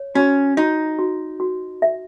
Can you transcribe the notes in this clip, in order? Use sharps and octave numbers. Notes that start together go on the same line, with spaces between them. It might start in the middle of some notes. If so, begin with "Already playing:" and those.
Already playing: C#5
C#4 F#4
D#4 F#4
F#4
F#4
E5